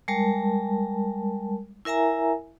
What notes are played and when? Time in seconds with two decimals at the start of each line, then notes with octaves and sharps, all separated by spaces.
0.08 G3 G#3 A#4 A5
1.85 E4 A#4 E5 G#5 A#5